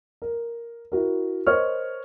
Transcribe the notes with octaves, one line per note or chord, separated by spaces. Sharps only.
A#4
E4 F#4 A#4
A#4 C5 C#5 D#5 C#6 F6